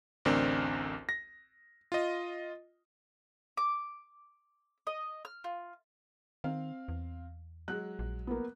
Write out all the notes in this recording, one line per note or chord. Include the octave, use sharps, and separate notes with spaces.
A1 D2 C4 D4 A#4
A#6
F4 D#5
D6
D#5
F6
F4
D#3 C4 F5
E2
F#3 G#3 F#6
A#1
A#3 B3